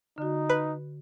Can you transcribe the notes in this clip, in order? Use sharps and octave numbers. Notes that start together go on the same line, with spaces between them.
D3 D#4 F#4
B4